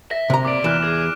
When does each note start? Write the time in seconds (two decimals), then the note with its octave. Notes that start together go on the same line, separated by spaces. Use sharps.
0.11 E5 A#6
0.30 C3 A#5
0.45 A#2 D5 D6 D7
0.64 E2 E3 F6 F#6 E7
0.84 G#4